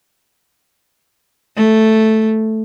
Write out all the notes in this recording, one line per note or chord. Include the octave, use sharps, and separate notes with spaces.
A3